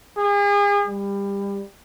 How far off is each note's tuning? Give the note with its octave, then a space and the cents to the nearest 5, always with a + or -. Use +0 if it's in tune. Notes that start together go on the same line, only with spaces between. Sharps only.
G#4 -40
G3 +25